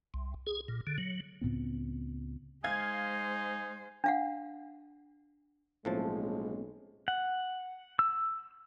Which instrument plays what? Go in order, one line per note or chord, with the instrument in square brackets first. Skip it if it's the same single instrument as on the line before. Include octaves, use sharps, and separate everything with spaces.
[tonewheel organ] C2
G#4
A#2
D3
F#3
[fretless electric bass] C#2 A2 B3 C4
[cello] G#3 C5 [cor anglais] D#4 [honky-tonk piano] F5 G#6 [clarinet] G#5
[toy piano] D4 F5 F#5
[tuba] B1 [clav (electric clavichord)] A2 F3 A5 [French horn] G#3 [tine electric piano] A#3 C4 C#4
[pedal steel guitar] F#5
E6